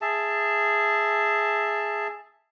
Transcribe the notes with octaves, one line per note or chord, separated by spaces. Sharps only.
G#4 E5 A5